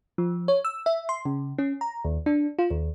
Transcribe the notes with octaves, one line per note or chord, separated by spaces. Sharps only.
F3
C#5
E6
E5
C6
C#3
C#4
A#5
D#2
D4
F4
D#2